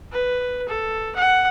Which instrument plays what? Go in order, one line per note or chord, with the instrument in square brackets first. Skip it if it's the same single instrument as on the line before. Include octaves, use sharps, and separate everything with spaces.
[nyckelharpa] B4
A4
F#5